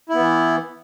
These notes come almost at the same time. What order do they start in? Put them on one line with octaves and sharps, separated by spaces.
E4 B3 E3